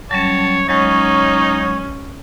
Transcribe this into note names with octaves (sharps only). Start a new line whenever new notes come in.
F#3 G3 C#4 C#5 A5
F#3 G#3 C#4 D#4 C#5 C#6